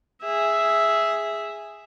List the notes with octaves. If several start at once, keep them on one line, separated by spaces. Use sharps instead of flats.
G#4 E5